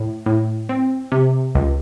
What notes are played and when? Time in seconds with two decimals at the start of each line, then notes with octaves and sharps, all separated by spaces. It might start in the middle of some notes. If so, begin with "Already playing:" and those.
Already playing: A2
0.26 A2
0.69 C4
1.12 C3
1.55 C#2